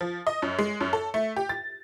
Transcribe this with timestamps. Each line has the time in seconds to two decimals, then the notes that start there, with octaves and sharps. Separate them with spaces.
0.01 F3
0.27 D#5
0.42 F#2
0.59 G#3
0.81 F#2
0.93 A4
1.14 A3
1.36 G4
1.49 A6